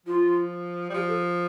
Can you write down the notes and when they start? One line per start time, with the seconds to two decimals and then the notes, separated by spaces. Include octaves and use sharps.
0.06 F3 F4
0.90 G3
0.94 F3 G4
1.08 A4